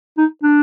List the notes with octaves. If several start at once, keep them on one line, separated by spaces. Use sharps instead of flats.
D#4
D4